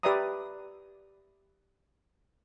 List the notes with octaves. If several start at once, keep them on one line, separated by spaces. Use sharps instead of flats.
G4 B4 D5 E5 A#5 D#6